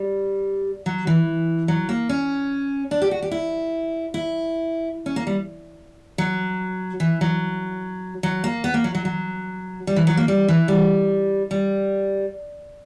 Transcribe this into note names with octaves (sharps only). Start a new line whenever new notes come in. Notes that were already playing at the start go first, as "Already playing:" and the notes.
Already playing: G3
F#3
E3
F#3
A#3
C#4
D4
G4
F#4
G4
E4
E4
C#4
A#3
G3
F#3
E3
F#3
F#3
A#3
B3
A#3
F#3
F#3
F#3
G3
E3
F#3
A#3
G3
E3
G3
G3